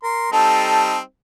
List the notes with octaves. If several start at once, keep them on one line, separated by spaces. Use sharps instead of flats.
A#4 C6
G3 C4 D#4 A4 A5